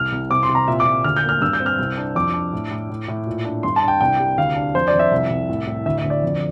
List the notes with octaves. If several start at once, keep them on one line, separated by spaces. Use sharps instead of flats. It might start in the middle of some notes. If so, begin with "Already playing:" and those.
Already playing: C2 F6
C2
C3 D6
C6
C3
A#5
A#2 E5
D6
A#2
D2 F6
G6
A#3
F6
G2 E6
G6
C4
F6
C2
D4
F2 D6
D4
A2
A2
A2
A2
A#2
D4
G2 C6
A5
D4
G5
C2 G5
G3
D2 F5
D4
F2 C5
D5
F2
E5
C2
C2
A2
A2
D2 E5
E5
D2
D5
F2